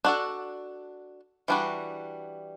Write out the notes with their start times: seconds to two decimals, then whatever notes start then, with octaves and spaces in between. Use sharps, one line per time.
0.05 D4 F#4 A4
1.48 E3 G3 D4 F#4